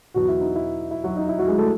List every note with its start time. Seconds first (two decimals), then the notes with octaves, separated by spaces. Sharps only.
0.14 E2 B2 F#3 B3 F#4
0.28 E4
0.41 D#4
0.56 E4
0.91 E4
1.04 F#3 F#4
1.17 D#4
1.29 E4
1.39 F#3 F#4
1.48 G#3 G#4
1.58 A3 A4